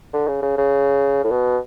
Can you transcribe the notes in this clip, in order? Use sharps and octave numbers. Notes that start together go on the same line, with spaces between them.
D3
C#3
C#3
C#3
A2
B2